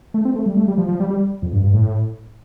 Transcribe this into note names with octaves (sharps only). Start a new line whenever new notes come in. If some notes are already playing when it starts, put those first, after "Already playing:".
A3
C4
A3
G3
A3
G3
F3
F3
G3
G3
F2
G2
G2
A2